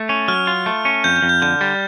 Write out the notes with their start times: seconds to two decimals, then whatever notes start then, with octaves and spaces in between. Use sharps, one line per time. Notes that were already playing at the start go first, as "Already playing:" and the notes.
Already playing: A3
0.09 C#4
0.28 F#3 F6
0.47 F4
0.66 A3
0.85 C#4
1.04 F2 G6
1.16 G6
1.22 F2
1.29 G6
1.42 D3 G6
1.61 G3